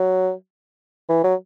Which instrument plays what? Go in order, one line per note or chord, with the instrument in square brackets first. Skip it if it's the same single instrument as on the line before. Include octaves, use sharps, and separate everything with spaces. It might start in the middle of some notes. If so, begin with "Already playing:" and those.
Already playing: [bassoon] F#3
E3
F#3